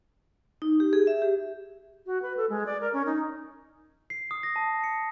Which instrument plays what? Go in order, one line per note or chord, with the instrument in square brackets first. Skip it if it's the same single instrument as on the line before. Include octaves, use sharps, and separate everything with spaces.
[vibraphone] D#4
G4
G#4
E5
G4
[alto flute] F#4
B4
A4
G#3
D5
A#4
C#4
D#4
[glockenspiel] C7
D#6
A#6
A5
C#7